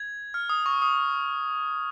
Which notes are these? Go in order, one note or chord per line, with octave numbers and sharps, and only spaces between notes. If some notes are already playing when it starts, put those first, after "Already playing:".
Already playing: G#6
F6
D#6
C#6
D#6